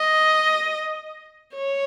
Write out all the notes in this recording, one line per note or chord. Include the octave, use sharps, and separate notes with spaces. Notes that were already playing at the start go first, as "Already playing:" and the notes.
Already playing: D#5
C#5